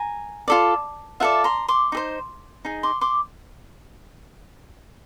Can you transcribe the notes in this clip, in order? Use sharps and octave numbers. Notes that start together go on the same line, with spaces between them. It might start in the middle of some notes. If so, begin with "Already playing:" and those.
Already playing: G#5 A#5
F4 A4 D5
F4 A4 D5 E5 F#5
A#5 C6
C6 D6
D#4 G#4 C5
D#4 G#4
C6 D6
C6 D6